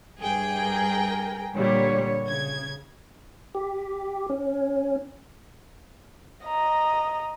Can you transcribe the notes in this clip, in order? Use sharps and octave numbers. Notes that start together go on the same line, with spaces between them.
G2 G#4 G5
A#4
A#2 D3 G3 C#5
C#3 G#6
G4
C#4
D#5 A#5